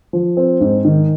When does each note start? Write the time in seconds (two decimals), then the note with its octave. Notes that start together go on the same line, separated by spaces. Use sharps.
0.13 F3
0.37 C4
0.61 G#2
0.85 D#3